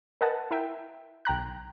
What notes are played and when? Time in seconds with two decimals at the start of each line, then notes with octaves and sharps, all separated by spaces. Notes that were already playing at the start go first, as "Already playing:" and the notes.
0.21 A#4 B4 D#5 F#5 G#5 A5
0.51 E4 A#4 E5 G5
1.25 B1 G5 A#5 F#6